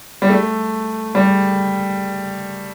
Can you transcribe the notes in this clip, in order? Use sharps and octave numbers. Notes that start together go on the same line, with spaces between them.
G3
A3
G3